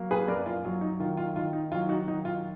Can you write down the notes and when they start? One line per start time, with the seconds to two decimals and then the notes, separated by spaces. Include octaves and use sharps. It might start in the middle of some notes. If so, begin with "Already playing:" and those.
Already playing: F#3 A#3
0.11 G#4 B4
0.28 F#2 A#4 D5
0.46 F4
0.65 F#3 F4
0.81 D#4
1.00 D#3 F4
1.17 F4
1.36 D#3 F4
1.53 D#4
1.72 F#3 F4
1.89 D#4 F#4
2.07 D#3 D#4
2.25 F4